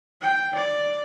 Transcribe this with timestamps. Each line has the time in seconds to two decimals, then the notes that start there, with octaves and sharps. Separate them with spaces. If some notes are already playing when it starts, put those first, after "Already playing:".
0.21 G5
0.55 D5